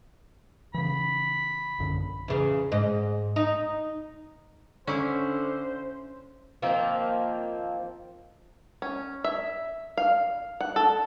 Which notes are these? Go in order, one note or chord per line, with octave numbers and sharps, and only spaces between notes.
C#3 E3 B5
A#1 F#2 D3
E2 C#3
G#2 D#5
D#4
D3 C#4 E4 C5
D#3 F3 A#3 C4
C#4
E5
F5
F#5
A4